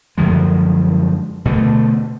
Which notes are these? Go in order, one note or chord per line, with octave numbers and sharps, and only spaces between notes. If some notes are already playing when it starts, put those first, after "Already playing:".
F#2 D3 F3 G#3
B2 D3 A3